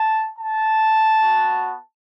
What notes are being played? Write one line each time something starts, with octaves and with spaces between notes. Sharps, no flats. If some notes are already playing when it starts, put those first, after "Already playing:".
Already playing: A5
A5
B3 F#4